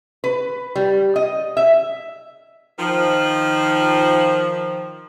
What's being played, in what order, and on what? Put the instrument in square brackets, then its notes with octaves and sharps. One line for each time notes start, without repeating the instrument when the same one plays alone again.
[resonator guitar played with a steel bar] B4
G3
D#5
E5
[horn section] D#3 F3